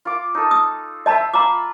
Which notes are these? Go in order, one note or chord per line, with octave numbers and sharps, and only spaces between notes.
F4 D6
D#4 A4
D#6
C5 D#5 E5 A5 B5
F4 A#5 B5 D6